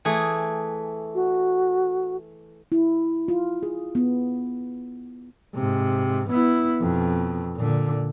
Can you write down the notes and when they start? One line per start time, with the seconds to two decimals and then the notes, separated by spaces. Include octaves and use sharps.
0.05 E3 A3 G#4
1.15 F#4
2.72 E4
3.28 F4
3.63 G#4
3.95 B3
5.55 G#2 C3
6.30 B3 E4
6.81 F2 B2
7.56 A#2 D3